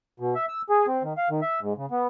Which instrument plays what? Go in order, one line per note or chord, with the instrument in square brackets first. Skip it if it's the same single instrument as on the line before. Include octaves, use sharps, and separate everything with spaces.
[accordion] B2
E5
E6
G#4
C4
D#3
F5
D#3
E5
G#2
C#3
B3